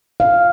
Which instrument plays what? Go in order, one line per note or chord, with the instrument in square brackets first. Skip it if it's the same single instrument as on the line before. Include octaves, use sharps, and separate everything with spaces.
[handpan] F5